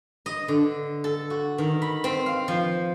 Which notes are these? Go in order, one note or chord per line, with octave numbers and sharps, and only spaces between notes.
D#5
D3
A4
F#4
D#3
B5
C4
F5
F3